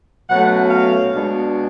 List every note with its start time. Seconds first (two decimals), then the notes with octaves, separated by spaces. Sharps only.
0.29 B2 F#3 A3 C#4 F#5
0.70 F5
1.12 B2 G#3 D4